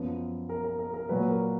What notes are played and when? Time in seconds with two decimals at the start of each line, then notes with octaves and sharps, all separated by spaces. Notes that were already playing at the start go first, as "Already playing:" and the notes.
Already playing: F#2 F3 B3
0.49 A#4
0.64 A#4
0.79 A#4
0.94 A#4
1.09 A#2 F#3 A#3 B4
1.29 A#4